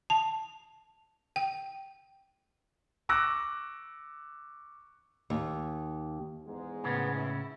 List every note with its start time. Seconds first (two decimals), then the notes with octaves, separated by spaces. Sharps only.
0.10 A5
1.36 G5
3.09 C#6 D6 E6 F#6 A#6
5.30 D#2
6.47 E2 G#2 G#3
6.84 A2 C#3 B3 C#4
7.17 E4